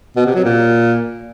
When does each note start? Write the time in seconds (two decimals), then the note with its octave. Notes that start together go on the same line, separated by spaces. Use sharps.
0.16 B2
0.26 C3
0.35 F#3
0.45 A#2